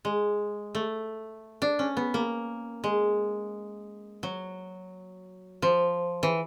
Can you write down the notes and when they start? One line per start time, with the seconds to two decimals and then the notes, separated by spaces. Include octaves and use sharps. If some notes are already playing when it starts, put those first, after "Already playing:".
0.05 G#3
0.75 A3
1.62 D4
1.79 C#4
1.97 B3
2.14 A#3
2.84 G#3
4.23 F#3
5.62 F3
6.23 E3